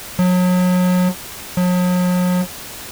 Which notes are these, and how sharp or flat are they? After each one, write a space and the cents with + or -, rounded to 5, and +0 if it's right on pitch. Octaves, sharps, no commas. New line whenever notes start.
F#3 -35
F#3 -45